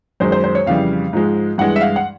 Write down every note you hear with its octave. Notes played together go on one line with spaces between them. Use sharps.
F#2 D#3 G#3 C5
C5
C5
C#5
F2 C#3 E3 G3 F5
G#2 F3 G#3
G2 E3 G#3 F#5
E5
F5
F#5